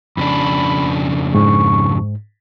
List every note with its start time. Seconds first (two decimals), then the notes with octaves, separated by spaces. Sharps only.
0.17 F2 C#3 D4 B5
1.35 G#2 C#6